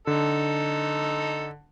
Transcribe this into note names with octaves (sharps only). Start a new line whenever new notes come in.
D3 D#4 A4